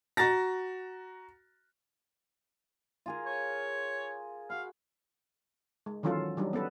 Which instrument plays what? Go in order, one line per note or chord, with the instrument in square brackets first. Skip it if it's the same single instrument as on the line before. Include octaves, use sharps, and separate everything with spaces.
[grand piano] F#4 A#5 A6 A#6
[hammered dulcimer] F4 G#4 A#4
[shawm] C#5
[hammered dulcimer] F#4 B5 [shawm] F5
[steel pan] G#3
D#3 E3 F#3 C#4 F4 A4
F#3 G3 D4 D#4
B3 C#4 A4 B4